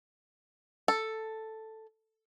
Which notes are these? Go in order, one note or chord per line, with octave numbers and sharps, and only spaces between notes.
A4